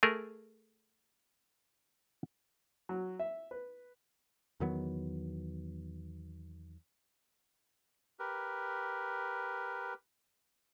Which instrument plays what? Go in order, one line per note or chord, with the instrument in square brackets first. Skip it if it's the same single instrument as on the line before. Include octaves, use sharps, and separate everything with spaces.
[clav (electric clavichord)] A3 G#4 A#4
[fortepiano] F#3
E5
B4
[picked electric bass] E2 D#3 F#3 B3
[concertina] G4 A#4 B4